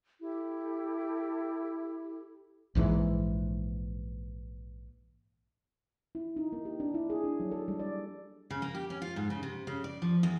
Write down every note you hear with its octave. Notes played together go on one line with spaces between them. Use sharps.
E4 G4 A4
A#1 G#2 D#3 E3
E4
D#4
A#3
G4
D4
E4
G#4
D4
F#3
A4
G3
D5
C#3
A#3
G4
C#4
F4
G#2
C#3
C3
C#3
D5
F3
E2